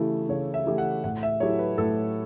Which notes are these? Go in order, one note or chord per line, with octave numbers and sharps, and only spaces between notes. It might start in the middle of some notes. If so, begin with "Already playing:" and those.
Already playing: C#3 E3 A3 E4 G4
C#3 C#5
E5
E3 A3 E4 G4
F#5
A2 F#5
E5
F#3 A3 E4 G4 C#5
B4
A2 A4